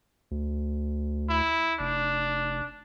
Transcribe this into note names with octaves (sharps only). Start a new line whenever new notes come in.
D2
E4
F1 D4